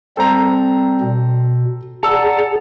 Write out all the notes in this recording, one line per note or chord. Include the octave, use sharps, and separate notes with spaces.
G3 C4 A4 C5 A#5
B2
G#4 D5 F#5 A5 A#5 E6